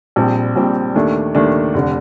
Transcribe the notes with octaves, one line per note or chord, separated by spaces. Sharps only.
A#1 A#2 G3 C4 G4
A#1 A#2 G3 C4 G4
D#2 D#3 A3 D4
D#2 D#3 A3 D4
F1 D3